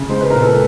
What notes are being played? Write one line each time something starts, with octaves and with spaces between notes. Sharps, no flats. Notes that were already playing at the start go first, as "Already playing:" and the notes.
Already playing: C#3
G#3 C5
B4
A#2 A#4
A4 B4